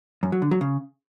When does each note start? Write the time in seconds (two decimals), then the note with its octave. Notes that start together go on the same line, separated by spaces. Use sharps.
0.23 F#2
0.32 F#3
0.42 D3
0.51 F#3
0.61 C#3